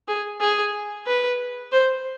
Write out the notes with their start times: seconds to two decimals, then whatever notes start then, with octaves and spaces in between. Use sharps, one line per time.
0.08 G#4
0.41 G#4
1.07 B4
1.72 C5